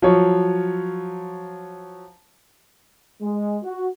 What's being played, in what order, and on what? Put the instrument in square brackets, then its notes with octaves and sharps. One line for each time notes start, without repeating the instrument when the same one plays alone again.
[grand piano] F3 F#3 C#5
[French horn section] G#3
F#4